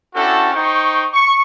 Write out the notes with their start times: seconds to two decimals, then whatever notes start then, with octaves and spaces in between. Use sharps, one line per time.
0.14 C#4 D4 E4 F#4 G4 A4
0.54 D#4 C5 G5 C#6
1.13 C#6